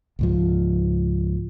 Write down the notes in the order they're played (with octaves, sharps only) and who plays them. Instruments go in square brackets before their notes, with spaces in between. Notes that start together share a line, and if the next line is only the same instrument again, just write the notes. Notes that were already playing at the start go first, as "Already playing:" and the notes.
[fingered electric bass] C#2 G#2 F3